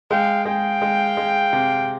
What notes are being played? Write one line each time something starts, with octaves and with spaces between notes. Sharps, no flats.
G#3 F5 G5
G#3 F5 G5
G#3
G#3
C3